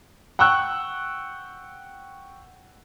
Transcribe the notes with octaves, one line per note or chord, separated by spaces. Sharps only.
F#5 G5 C#6 E6 F#6